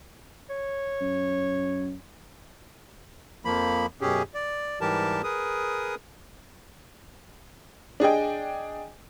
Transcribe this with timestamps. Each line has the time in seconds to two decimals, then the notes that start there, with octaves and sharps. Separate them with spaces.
0.49 C#5
1.01 F#2
3.45 F2 F3 A#3 B5
4.01 F#2 B2 C#4 G4 G#4
4.34 D5
4.81 G#2 E3 G3 G4 A#4 A5
5.24 G#4 A#4 B4 D#6
8.00 D4 G#4 D#5 G5